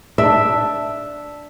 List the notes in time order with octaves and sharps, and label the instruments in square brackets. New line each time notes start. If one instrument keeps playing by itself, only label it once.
[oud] D4 [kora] E5